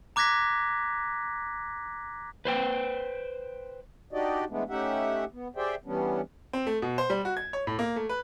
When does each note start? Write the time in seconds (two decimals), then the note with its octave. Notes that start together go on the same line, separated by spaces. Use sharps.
0.16 A#5 D6 F#6 G#6 A#6 B6
2.45 B4 C5 G5
4.13 D4 D#4 F#4 G4 D5 D#5
4.50 E3 G#3 A3 B3 D4
4.69 A3 C#4 D#4 G4 E5 F#5
5.32 B3
5.56 G4 G#4 C5 D5 E5 G5
5.85 E3 G3 B3 C#4 D4
6.53 C4
6.67 A3
6.82 B2
6.98 C5
7.10 G3
7.25 F#4
7.37 G#6
7.53 C#5
7.67 A2
7.79 A#3
7.96 A3
8.09 B4